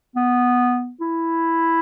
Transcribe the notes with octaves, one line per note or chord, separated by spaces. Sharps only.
B3
E4